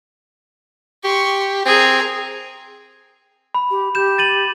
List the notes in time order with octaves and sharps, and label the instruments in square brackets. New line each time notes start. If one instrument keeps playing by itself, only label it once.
[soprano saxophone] G4 [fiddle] C6 C#6
[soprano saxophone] C4 [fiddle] G#4 A#4
[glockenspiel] B5
[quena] G4
[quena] G4 [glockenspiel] G6 E7
[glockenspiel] A6 D#7 F#7